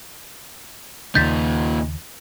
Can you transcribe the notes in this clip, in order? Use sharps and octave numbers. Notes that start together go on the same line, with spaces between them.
D#2 A#2 C#3 D#4 G6 A6 B6